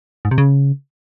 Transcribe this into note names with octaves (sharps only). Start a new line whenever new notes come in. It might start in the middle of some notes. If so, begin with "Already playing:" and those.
G#2
C3
C#3